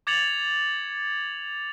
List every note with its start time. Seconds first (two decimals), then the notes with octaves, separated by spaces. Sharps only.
0.07 D6 G#6 A6 C#7 F7 F#7